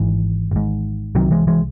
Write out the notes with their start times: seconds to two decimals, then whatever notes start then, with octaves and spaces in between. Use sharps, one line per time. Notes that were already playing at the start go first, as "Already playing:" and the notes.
Already playing: G#1 G#2 E3
0.51 G#1 G#2
1.15 C2 C3 D#3 F#3
1.31 E3 G#3
1.47 E3 G#3